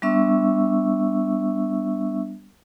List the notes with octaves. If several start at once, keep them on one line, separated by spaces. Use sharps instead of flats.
G3 B3 D4 E5 C#6 E6